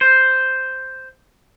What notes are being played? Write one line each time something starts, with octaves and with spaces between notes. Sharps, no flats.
C5